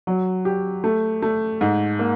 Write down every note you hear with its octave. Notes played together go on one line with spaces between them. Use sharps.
F#3
G4
A3
A3
G#2
A#3